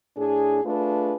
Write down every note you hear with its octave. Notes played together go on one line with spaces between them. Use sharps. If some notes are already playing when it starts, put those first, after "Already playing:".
A2 D4 G#4
A3 D4 F4 G#4 B4